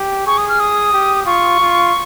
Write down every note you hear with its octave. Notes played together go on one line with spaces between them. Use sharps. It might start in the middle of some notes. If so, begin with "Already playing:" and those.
Already playing: G4
G#4 C#6
D#6
F6
D#6
G4
F4 C#6
F4